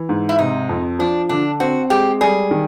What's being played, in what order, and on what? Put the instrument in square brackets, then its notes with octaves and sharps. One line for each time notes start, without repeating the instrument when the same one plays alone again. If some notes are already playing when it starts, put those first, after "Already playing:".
Already playing: [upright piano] E3
G#2
[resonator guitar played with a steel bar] E4
[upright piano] C3 [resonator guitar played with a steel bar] D#4
[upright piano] F2
[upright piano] F3 [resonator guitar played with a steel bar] D4
[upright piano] D3 [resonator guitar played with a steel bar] D4
[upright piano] C4 [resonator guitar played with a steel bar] F#4
[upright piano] G#3 [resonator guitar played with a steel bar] G4
[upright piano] G3 [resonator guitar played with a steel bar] G#4
[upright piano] D#3